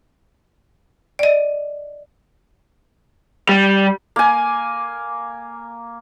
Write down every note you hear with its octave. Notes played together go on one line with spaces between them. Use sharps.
D5 D#5
G3
A#3 G#5